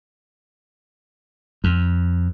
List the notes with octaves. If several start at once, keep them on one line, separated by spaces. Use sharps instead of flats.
F2